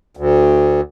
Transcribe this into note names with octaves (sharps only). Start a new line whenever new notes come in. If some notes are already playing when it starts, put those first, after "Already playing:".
D2